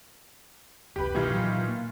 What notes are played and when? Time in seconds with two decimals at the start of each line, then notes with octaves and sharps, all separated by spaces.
0.96 E1 C2 G4 B4
1.15 B2 D#3 E3 F4
1.29 A#2 F#3
1.69 A#3